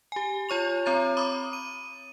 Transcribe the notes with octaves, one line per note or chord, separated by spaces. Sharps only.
G4 G#5
F4 C#5 C#6 F7
C4 C#5 A#5 A6
B5 D6 D#6
D#7